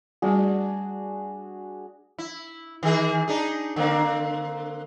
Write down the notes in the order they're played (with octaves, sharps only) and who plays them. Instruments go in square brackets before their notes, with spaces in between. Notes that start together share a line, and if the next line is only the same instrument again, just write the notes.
[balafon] G3 A3 D5 [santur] D4 F#4 G#4
[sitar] E4
D#3 E3 G#4
D4 D#4 G#4
D3 A#3 C4